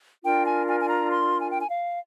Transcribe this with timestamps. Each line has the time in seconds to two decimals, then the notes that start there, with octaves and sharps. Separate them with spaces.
0.23 D4 F4 A#4 G5
0.46 G#5
0.67 G#5
0.80 G#5
0.88 A#5
1.10 C6
1.40 G#5
1.49 G5
1.59 G#5
1.68 F5